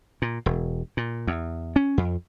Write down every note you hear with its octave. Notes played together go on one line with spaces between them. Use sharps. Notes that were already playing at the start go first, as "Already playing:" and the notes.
A#2
E1
A#2
E2
C#4
F2